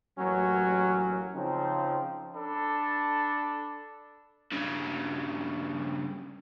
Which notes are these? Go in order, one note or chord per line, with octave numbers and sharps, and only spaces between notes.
A1 F#3 A#3 C#4
C#3 F3 C4 D#4
D4 A4 B5
G2 C#3